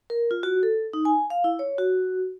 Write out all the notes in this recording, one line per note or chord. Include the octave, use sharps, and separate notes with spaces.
A#4
F4
F#4
A4
D#4
G#5
F5
E4
C#5
F#4